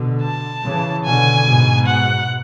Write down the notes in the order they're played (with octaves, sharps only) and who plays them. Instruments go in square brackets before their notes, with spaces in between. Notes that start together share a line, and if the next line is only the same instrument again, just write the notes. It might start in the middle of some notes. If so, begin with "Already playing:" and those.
Already playing: [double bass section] B2 D3
[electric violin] A5
[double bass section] C#3 E3
[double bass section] B2 D3 [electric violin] G#5
[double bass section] G#2 B2
[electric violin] F#5